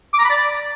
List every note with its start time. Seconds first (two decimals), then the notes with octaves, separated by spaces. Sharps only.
0.14 D6
0.19 A#5
0.25 B5
0.30 D5